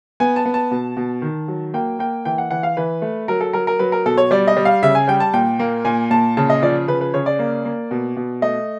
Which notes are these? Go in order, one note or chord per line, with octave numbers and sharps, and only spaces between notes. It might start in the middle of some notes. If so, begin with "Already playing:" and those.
B3 G#5
A5
B3
A5
B2
B2
D#3
F#3
A#3 G5
A#3 G5
E3 G5
F#5
E3 F#5
F5
E3 B4
A3
F#3 A#4
A4
F#3 A#4
A#4
F#3 B4
A#4
B2 A4
C#5
G3 D5
D#5
G3
F5
C#3 E5
G#5
G3 G5
A5
A#2 G5
A#3
A#2 G#5
A#2 A5
C#3 A5
D#5
F3 D5
C#3 B4
B4
C#3 C#5
D5
A#3
A#3
B2
B2
A3 D#5